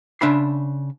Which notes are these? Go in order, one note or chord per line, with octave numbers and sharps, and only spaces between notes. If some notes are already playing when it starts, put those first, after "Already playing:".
C#3 D4 E5 B5 C6